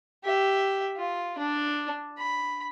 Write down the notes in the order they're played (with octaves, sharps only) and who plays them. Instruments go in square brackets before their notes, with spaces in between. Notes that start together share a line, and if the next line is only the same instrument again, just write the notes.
[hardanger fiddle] G4 E5
F4
D4
B5